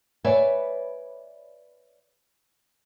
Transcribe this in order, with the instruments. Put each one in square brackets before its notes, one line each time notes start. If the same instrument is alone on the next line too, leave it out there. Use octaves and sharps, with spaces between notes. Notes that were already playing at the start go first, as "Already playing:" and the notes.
[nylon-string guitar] B4 C#5 D5 E5 G#5